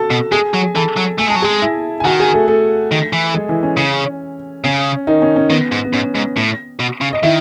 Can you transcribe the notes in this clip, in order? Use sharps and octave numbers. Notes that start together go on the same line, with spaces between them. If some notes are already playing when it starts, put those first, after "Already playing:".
Already playing: F#4 A4 A5
B2
G#3 G#4 G#5
F#3
E3 A4 A5
F#3
A3 G#5
G#3 A5
F#3
G#3 G#4 G#5
E4 E5
G#5
D#3 F#4 F#5
G#4 G#5
A3 A4
A3 A4
D#3
E3
G#3 G#4
E3 E4
C#4
C#3
C#3 C#4
D#3 D#4
C#4
C#4
D#3 B3
G#2
B3
G#2 C#4
G#2
A2
B2
C#3
D#5
D#3 E4 E5